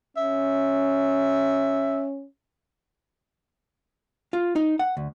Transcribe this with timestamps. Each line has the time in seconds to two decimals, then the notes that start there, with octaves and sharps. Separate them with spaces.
0.17 C#4 E5
4.33 F4
4.56 D#4
4.79 F#5
4.97 D2